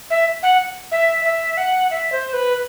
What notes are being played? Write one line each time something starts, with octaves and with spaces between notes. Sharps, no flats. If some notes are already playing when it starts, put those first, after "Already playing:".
E5
F#5
E5
E5
F#5
E5
C5
B4